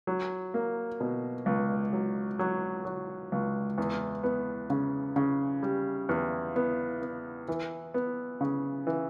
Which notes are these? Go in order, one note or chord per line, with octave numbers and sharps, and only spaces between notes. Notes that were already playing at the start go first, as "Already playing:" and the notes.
F#3
A#3
B2
C#2
F#3
F#3
F#3
C#2
E2
B3
C#3
C#3
G3
E2
B3
B3
E3
B3
C#3
E3